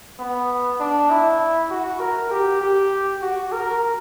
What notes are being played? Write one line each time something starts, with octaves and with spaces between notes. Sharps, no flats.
B3
D4
E4
F#4
A#4
G4
G4
F#4
A#4